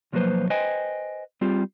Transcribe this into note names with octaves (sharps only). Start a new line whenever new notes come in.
B1 F3 F#3 A#3 B4 C5
B4 C5 D#5 G5 G#5
G3 C4 F4 G4